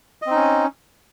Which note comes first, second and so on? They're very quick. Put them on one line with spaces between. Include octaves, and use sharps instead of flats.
D#5 C4 D#4 C#4